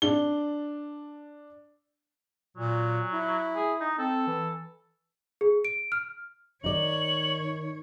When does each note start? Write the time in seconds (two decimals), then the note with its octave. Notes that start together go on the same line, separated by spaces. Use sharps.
0.02 D4 G7
2.57 A#2 F#3
3.13 E4
3.55 G#4
3.81 D#4
3.99 C4 A4
4.27 E3
5.41 G#4
5.65 D7
5.92 F6
6.64 D#3 D#4 C#5 D5 F#7